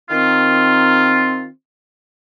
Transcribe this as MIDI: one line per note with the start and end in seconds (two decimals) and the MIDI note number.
0.10 1.45 51
0.10 1.49 60
0.10 1.45 65